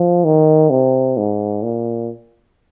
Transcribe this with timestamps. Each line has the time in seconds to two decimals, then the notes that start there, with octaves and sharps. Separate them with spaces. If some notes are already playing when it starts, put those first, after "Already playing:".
Already playing: F3
0.25 D#3
0.71 C3
1.17 G#2
1.63 A#2